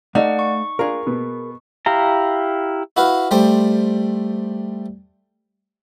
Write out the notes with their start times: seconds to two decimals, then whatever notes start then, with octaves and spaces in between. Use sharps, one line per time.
0.15 A3 D#4 D5 D#5 F5 F#5
0.39 C#6
0.79 D4 F4 G#4 A#4
1.06 B2 B3
1.86 E4 G4 F5 A#5
2.97 E4 F#4 B4 F5
3.31 G3 A3 C5 G5